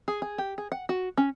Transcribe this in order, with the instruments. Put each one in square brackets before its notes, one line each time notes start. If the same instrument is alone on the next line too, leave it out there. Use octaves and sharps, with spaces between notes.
[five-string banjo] G#4
G#4
G4
G#4
F#5
F#4
C#4